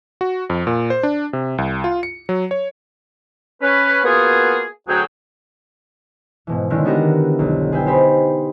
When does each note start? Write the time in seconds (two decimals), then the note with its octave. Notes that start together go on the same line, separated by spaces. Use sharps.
0.21 F#4
0.50 F2
0.67 A#2
0.90 C5
1.03 D4
1.33 C3
1.58 C2
1.84 F4
2.03 C#7
2.29 F#3
2.51 C#5
3.62 C#4 B4
4.04 A#3 B3 F4 F#4 G#4
4.88 D2 F#3 G#4 G5
6.47 G#2 B2 E3
6.70 D3 D#3 G#3 C#4 E4
6.85 B3 D4 F#4 G4 A#4
7.39 F1 B1
7.72 G#4 B4 E5 G5
7.86 D#4 G4 C5 G#5 B5